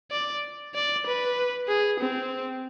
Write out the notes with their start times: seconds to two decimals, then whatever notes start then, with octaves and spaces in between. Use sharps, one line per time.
0.11 D5
0.75 D5
1.06 B4
1.68 G#4
2.00 C4